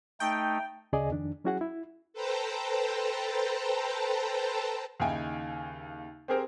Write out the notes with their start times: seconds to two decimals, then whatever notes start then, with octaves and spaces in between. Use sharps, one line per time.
0.20 A3 D#4 G5
0.93 D2 C#3 G#4 D5 D#5 G#5
1.10 F2 D#3 D4
1.44 F#3 C#4 E4 F#4 G#4 F#5
1.61 E4
2.13 A4 B4 C5 G5 A5 A#5
5.00 D#2 C#3 D#4 E4 G5 G#5
6.28 C4 G4 G#4 A#4 C5